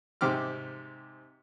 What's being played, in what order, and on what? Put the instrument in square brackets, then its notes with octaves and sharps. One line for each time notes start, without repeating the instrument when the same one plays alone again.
[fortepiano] G#2 C3 G4 D6 F6